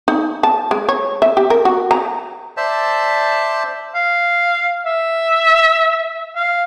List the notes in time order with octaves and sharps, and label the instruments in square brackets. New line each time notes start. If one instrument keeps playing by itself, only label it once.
[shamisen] D#4
A5
G#3
C#5
E5
G4
A#4
F#4
A#5
[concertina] C5 D5 E5 A5
[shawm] F5
E5
F5